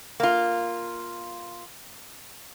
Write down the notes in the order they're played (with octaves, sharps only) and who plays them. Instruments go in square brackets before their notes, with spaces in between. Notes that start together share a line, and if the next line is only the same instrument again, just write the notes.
[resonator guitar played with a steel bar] A#3 F4